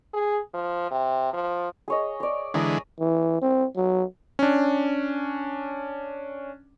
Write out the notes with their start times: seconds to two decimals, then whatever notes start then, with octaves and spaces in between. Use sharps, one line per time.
0.14 G#4
0.54 F3
0.91 C3
1.33 F3
1.88 G#4 C#5 D#5
2.20 C#5 D5
2.54 D3 E3 G#3 A#5 D#6
3.00 E3
3.42 C4
3.76 F#3
4.39 C#4 D4